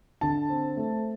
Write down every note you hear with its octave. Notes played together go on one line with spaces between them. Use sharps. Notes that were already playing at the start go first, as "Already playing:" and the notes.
D3 A5
C4
A3